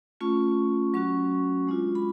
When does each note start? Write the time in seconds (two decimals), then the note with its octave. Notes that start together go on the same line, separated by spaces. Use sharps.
0.21 A3 C#4 F4 C#6
0.94 F#3 C#4 F#4 C#6
1.67 G#3 D4 F4
1.95 B5